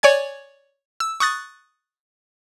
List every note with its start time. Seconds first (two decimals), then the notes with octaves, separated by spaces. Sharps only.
0.03 C#5 D5 G#5 G#6
1.00 E6
1.20 C#6 D#6 F#6 A6